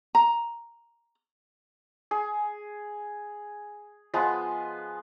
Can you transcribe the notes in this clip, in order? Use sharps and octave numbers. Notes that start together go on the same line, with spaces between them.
A#5
G#4
F3 G#3 B3